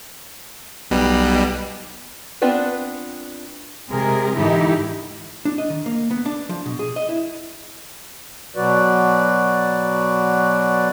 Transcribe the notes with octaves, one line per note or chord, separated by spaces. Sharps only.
B1 B2 G3
B3 C4 D4 F4 B4
C3 G#3 G#4 A#4
G#2 D3 E3 D#4 E4 G4
D4
D#5
D#3
A#3
B3
D4
F3
B2
G#4
D#5
E4
B2 F#3 F#4 B4 D5